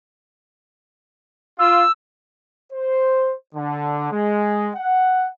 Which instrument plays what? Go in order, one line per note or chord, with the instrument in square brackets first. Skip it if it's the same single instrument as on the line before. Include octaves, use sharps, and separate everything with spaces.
[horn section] F4 [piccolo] E6
[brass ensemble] C5
D3
G#3
F#5